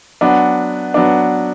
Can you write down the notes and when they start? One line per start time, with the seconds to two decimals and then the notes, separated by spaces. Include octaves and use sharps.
0.21 F#3 B3 D4
0.94 F#3 B3 D4